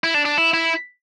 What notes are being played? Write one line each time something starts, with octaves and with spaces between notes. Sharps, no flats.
E4
D4
D4
E4
E4